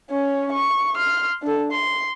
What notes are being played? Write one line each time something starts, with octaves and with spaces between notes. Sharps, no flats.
C#4 C#5
C#6
C6 F6
D4 A4
C6